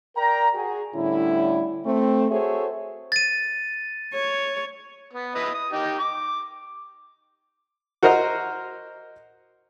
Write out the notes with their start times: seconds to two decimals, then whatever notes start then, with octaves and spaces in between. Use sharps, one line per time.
0.16 A#4 D5 G5 A#5
0.55 F#4 G#4
0.94 A2 D3 G3 C#4 E4
1.85 A3 C4
2.31 F#4 G#4 A4 C5 C#5 E5
3.12 A6 D#7
4.14 C#5
5.13 B3
5.35 E4 B4 D#5
5.54 D#6
5.72 D#4 G4
5.99 D6
8.03 F#4 A#4 C5 D#5 A#5 F6